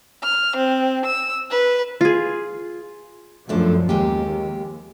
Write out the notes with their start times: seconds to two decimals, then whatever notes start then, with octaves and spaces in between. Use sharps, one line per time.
0.24 F6
0.56 C4
1.05 E6
1.51 B4
2.01 F4 G#4
3.49 F#2 F3 A3 D4
3.89 D#2 G#3 A#3 G4